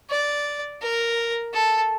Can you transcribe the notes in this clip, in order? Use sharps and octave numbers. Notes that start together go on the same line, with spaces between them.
D5
A#4
A4